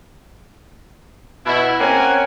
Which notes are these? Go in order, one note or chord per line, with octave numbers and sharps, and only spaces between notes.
B2 E4
A#3 C4 C#4 A#4 F#5 G#5